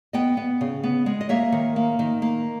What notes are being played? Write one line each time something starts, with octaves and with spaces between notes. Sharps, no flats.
B3 D#5 G5
B3
C#3
B3
G#3
D#5
A#3 C#5 E5
D#3
A#3
D#3
A#3